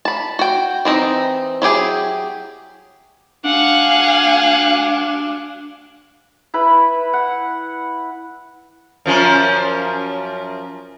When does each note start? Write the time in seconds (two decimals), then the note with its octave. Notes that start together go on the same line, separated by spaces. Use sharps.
0.05 A5 B5
0.39 F#4 G5
0.85 E3 C4 D#4
1.62 F#3 E4 G4 G#4
3.44 D4 F5 F#5 G#5
6.54 E4 B4 B5
7.13 F#5
9.06 F#2 F3 C#4